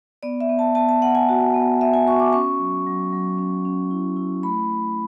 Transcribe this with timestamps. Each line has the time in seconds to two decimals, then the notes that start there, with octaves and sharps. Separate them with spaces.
0.23 B3 D5
0.40 E5
0.49 B3
0.59 A5
0.75 B3 A5
0.89 A5
1.02 B3 F#5
1.15 G#5
1.29 F#4
1.54 B3
1.81 B3 E5
1.94 G#5
2.07 F#4 C#6
2.20 D6
2.33 C#4 C#6
2.59 F#3
2.86 F#3
3.12 F#3
3.38 C#4
3.65 C#4
3.91 E4
4.17 E4
4.43 A3 B5
4.70 A3